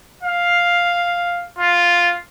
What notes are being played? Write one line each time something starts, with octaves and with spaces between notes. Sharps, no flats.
F5
F4